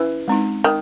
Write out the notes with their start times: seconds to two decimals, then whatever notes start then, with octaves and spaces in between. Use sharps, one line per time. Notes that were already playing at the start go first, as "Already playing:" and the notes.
Already playing: E3 C#4
0.28 G#3 C4 D#4
0.64 D#3